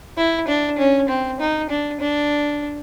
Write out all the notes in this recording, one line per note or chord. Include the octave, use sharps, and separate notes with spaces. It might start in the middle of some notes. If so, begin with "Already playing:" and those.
E4
D4
C#4
C4
D#4
D4
D4